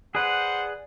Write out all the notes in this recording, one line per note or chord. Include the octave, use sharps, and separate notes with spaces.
G#4 B4 C5 D5 F#5